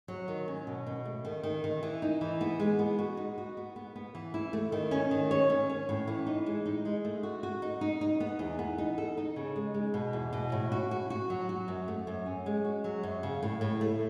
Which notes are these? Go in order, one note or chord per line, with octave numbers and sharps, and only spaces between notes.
F#3
D#3
C#4
B2
B2
A3
D#3
D#3
D#3
E3
D#4
E3
B3
G#3
B3
F#4
D#4
F#4
B3
B3
B3
E3
E4
A3
D#3
C#4
D#3
C#5
C#4
C#4
A2
E3
D#4
G#3
D#4
G#3
A3
F#4
F#4
D#4
D#4
D#4
B3
E2
B3
D#4
A4
D#4
C#3
G#3
G#3
B2
E2
B2
A2
F#4
F#4
F#4
F#3
F#4
F#2
A3
F#2
C#4
G#3
F#4
F#3
F#2
C#3
A2
A2
A3